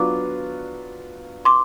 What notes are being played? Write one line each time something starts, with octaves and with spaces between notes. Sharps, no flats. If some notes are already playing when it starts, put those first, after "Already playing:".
Already playing: F#3 B3 D4 F4 D6
C6 D6